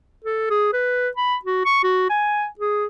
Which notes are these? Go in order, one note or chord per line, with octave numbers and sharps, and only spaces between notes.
A4
G#4
B4
B5
F#4
C#6
F#4
G#5
G#4